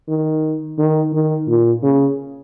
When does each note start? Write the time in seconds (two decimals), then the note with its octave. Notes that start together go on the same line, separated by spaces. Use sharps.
0.09 D#3
0.78 D#3
1.13 D#3
1.48 A#2
1.83 C#3